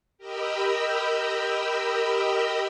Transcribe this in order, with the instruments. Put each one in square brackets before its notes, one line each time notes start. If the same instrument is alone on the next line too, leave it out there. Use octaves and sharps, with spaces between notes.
[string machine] G4 A#4 D#5 G5 B5 E6